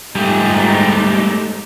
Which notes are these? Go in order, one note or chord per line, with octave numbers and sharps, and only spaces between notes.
G#2 G3 A3 D#4 G4 G#5